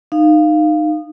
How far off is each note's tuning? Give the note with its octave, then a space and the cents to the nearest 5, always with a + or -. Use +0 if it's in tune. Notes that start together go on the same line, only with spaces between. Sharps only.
D#4 -20 F5 -5